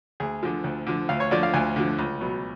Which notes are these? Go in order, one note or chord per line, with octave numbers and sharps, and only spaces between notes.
D2 G#4
D3 F3
D2
D3 F3
D2 F5
C#5
D3 F3 D5
F5
D2 G#5
D3 F3
C#2
B2 F#3